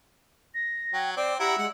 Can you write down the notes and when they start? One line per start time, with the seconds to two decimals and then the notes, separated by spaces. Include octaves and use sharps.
0.54 A#6
0.93 F#3 G5
1.17 C4 D5 D6
1.40 E4 G4 F#5 A#5 E6
1.58 G#3 F#5